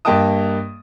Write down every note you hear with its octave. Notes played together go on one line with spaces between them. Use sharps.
G2 A#3 D#5 G5 A5 D#6